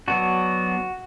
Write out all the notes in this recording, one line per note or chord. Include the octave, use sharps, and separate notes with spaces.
F#3 B3 D4 F#4